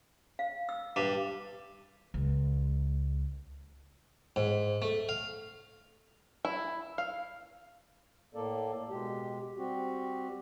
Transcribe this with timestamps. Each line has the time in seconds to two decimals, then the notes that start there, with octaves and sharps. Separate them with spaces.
0.39 F5
0.69 E6
0.96 G2
2.14 C#2
4.36 G#2
4.82 A3
5.09 F5
6.45 E4
6.98 F5
8.34 A2 A#3 A4 D5
8.90 B2 G#3 G4
9.57 G3 C4 F#4 G4